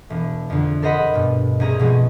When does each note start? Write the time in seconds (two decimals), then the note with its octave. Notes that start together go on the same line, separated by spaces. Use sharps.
0.10 E1
0.50 F2 D3
0.82 A4 A#4 C5 D#5 F#5 B5
1.14 G2 B2
1.60 C2 C#4 G#4 A#5
1.79 B2 F3 G#3 C#4